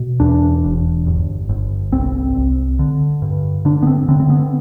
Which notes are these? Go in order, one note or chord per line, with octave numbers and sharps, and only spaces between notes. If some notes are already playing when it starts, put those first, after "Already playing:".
Already playing: B2
E2 D4
E1
G1
G1
C2 C4
C2
D3
G2
D3 D4
B3
C4
D3 C4
C4
B3